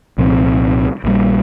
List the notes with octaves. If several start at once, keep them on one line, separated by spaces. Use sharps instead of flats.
C2 A#2 F3 C4
A#1 A#2 G3